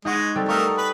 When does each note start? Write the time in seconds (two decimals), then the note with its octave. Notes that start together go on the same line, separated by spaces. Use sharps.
0.05 G#3 D#4 F#5 C#6
0.35 G3 C4 A4
0.49 A3 A#4 F5 C#6 D#6 E6
0.77 B4 B5